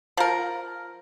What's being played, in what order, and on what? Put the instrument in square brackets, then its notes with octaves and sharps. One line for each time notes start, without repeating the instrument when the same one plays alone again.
[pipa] F3 A#4